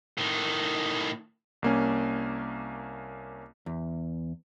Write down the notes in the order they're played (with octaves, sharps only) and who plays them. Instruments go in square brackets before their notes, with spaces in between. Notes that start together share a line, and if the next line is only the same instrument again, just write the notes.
[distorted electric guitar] A2 D#3
[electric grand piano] C2 A#3 C#4
[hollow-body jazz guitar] E2